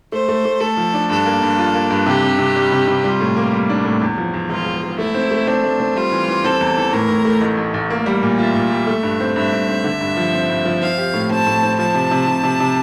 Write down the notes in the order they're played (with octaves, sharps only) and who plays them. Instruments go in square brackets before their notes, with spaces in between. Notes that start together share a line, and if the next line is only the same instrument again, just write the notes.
[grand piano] A3 [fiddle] C5
[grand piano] A3
A3
[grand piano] A3 [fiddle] A4
[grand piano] F3
D4
[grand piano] G2 [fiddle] A4
[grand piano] A#3
G2
F4
A#3
G2
[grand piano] C3 [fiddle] G4
[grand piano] C3
C3
G3
C3
C3
[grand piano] G3 [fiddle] F4
[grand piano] A2
A#3
G3
D4
A2
E2
F3
E2
[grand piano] E1 [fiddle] F4
[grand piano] E1
E1
[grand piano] A3 [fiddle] E4
[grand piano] C4
A3
[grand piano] C4 [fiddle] D4
[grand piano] A3
C4
[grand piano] G3 [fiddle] F4
[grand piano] E3
E3
[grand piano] C4 [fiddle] A4
[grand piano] E2
E3
[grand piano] A2 [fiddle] A#4
[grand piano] A2
A3
A1
A1
A1
A#3
G3
A#2
[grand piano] F4 [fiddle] E5
[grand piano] A#2
G3
A3
G2
C4
[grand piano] G2 [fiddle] E5
[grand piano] G2
C4
D3
G2
F3
C4
G2
F3
[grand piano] C4 [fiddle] F5
[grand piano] G4
A2
[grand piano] C4 [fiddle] A5
[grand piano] A2
C4
[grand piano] F3 [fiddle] A5
[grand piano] C3
C3
C3
C3
C3